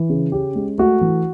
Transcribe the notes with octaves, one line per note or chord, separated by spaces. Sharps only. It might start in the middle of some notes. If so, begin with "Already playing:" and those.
Already playing: E3
C#3
C#4 G4
G#3
A3 F#4
E3